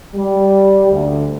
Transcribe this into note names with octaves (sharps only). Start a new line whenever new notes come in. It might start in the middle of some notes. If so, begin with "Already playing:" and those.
G3
D2